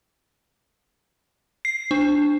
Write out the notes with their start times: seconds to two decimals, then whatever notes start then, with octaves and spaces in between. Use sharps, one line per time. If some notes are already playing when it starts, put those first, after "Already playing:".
1.65 C7
1.91 D4